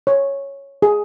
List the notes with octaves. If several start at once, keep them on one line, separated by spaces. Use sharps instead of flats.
C#5
G#4